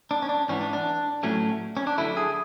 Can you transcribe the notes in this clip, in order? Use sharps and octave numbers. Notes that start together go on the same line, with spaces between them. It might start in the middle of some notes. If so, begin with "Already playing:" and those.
D4
C#4
D4
G#2 E3 B3 C#4
D4
D4
A2 F#3 A3 C#4
C#4
D4
D2 D3 F#3 A3 E4
G#4